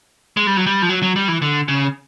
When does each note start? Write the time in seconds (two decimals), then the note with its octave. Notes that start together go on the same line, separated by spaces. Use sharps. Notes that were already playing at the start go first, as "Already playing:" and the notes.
0.37 G#3
0.47 G3
0.57 F#3
0.67 G3
0.82 F3
0.89 F#3
1.03 F#3
1.16 G3
1.28 E3
1.42 D3
1.68 C#3